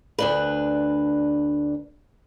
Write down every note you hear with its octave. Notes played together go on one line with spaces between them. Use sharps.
D2 D4 B4